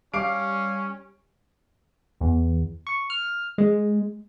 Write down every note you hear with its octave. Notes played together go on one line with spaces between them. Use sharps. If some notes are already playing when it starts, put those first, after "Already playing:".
G3 C#4 F5 D6 D7
E2
C#6
F6
G#3